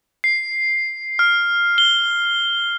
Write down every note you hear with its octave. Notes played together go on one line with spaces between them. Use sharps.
C7
F6
G7